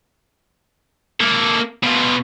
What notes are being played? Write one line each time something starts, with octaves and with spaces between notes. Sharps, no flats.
A#3 A4
B2 F4